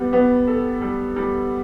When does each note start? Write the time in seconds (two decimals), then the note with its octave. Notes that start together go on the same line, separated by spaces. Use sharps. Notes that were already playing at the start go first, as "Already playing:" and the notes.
Already playing: G3 B3
0.13 B3
0.48 A4
0.82 G3
1.16 G3